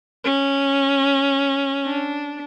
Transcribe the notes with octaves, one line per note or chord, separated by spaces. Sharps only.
C#4
D4